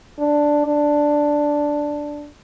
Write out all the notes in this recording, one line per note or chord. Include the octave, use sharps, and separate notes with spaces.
D4
D4